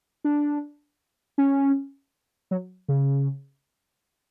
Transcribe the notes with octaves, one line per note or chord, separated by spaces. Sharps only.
D4
C#4
F#3
C#3